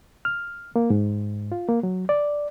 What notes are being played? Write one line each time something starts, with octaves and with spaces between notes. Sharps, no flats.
F6
A#3
G#2
F4
A#3
F#3
D5